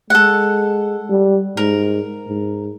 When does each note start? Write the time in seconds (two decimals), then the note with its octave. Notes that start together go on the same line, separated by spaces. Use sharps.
0.10 G#3 A4 F#5
1.09 G3
1.57 G#2 A#4
2.28 G#2